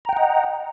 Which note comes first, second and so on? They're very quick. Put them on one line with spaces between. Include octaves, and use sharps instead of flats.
A#5 G5 F#5 D#5